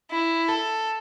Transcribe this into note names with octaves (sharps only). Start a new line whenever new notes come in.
E4
A4